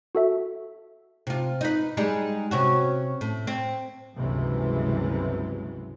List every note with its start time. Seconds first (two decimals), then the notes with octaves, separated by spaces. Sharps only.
0.15 F#4 A4 E5
1.27 C3 F4
1.61 D#4 B4
1.97 G3 G#3 D#4
2.51 C3 C#4 F#4
3.21 A2
3.47 C4
4.17 G1 C#2 C3 E3 F#3 G#3